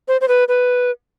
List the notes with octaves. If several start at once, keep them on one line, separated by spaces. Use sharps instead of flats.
C5
C5
B4
B4